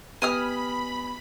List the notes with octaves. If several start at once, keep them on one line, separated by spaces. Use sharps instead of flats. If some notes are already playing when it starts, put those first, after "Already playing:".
B3 G4 D#5 G#5 B5 D#6 F6